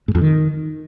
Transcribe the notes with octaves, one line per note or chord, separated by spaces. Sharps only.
G#2
F2
D#3